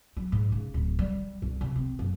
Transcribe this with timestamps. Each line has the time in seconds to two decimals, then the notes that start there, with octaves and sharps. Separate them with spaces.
0.17 F#3
0.32 G#2
0.52 C#3
0.74 D1
0.99 G3
1.42 C2
1.61 C3
1.76 C4
1.99 F#1